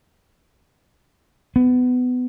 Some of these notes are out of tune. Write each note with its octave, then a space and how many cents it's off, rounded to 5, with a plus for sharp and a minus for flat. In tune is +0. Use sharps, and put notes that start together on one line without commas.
B3 +20